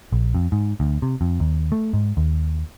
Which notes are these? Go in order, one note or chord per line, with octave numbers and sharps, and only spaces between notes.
A#1
F2
G#2
D2
C3
F2
D#2
A3
G#2
D#2